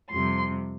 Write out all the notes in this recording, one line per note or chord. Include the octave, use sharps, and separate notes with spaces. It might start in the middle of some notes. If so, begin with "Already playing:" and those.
F2 C3 G3 C6